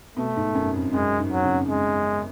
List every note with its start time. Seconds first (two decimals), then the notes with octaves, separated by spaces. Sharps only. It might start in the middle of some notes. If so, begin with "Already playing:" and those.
0.17 B2 A3
0.36 G#2
0.55 F#2
0.74 F2
0.94 F#2 G#3
1.19 G#2
1.32 F#3
1.45 C#3
1.69 G#3